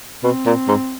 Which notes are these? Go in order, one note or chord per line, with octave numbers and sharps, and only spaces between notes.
B2 C4
A#2
G#2